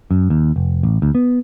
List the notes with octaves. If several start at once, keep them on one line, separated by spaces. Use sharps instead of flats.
F#2
D#2
F1
A1
D2
B3